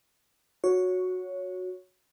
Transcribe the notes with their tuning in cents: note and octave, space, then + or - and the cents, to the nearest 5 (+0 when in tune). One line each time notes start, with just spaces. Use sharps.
F#4 -15 C#5 +5